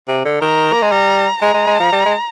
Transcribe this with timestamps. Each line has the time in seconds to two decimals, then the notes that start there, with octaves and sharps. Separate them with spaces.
0.08 C3
0.25 D3
0.41 D#3 A#5
0.73 A#3
0.83 G#3
0.92 G3 A#5
1.42 G#3 A#5
1.54 G#3
1.67 G#3
1.80 F3
1.92 G3
2.05 G#3